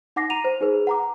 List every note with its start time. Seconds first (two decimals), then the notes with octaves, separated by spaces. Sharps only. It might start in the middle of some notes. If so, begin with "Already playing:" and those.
0.16 D#4 F#5 D6 A#6 C7
0.30 A#5 D#7 F7
0.44 C5
0.61 D#4 G#4 B4
0.87 F#5 A#5 D6